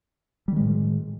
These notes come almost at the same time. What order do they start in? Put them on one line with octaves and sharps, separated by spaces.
G3 D#3 G#3 A2